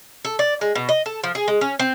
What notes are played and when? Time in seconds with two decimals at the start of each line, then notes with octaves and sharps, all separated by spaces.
0.25 A4
0.39 D5
0.61 G#3
0.75 B2
0.89 D#5
1.06 A4
1.24 F3
1.35 G#4
1.48 G#3
1.61 C#4
1.79 C4